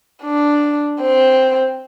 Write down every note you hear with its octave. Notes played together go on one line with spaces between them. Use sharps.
D4
C4